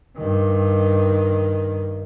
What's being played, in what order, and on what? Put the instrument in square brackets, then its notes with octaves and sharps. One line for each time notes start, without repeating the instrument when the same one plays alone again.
[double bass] G2 D#3